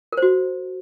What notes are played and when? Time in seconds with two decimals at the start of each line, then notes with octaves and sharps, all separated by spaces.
0.12 A#4
0.17 C5
0.22 F#4